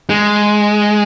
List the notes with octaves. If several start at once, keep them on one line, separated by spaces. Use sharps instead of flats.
G#3